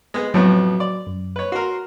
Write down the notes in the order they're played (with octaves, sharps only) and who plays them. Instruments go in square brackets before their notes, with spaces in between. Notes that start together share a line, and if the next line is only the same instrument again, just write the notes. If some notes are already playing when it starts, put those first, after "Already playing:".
[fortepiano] G#3 B3 G#4
[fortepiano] F2 A2 B3 [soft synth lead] F#3
[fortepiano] D5
[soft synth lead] F#2
[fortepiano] B4 C#5
[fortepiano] F#4 A#4 [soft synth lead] C6